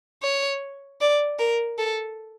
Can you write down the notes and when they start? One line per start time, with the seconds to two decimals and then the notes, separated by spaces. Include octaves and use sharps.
0.23 C#5
1.01 D5
1.39 A#4
1.79 A4